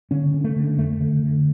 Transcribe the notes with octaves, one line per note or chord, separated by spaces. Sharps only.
D3 C#4
D3
A3
D3
F2 A3
D3
D3